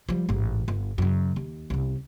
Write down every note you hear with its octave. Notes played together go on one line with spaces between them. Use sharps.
F3 G3
A1 G#2
G1
F#2 C#3
D#2
C2 C#4